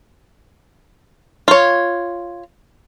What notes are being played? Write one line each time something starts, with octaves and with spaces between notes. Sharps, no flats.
F4 C#5